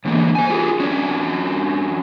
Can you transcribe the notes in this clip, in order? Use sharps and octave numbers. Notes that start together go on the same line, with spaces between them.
G#2 D3 E3 A#3
C5 G#5
F4 G4 G#4 A#4
F#3 C#4 D4